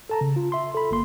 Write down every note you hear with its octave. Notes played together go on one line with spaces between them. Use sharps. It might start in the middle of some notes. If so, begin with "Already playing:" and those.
A4 A5 A#5
C#3
F4
E5 C6
A4 B5
G1 A#3 C6